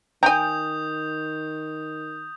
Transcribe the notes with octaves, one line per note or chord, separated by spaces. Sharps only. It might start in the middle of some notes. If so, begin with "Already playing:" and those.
D#3 G5 G#5 A#5 D#6 G6